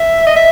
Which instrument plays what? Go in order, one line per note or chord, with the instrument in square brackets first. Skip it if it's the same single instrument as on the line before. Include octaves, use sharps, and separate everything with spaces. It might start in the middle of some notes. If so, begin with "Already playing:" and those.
Already playing: [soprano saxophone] E5
D#5
E5